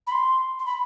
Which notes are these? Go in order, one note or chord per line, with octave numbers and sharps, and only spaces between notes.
B5
C6
C6
B5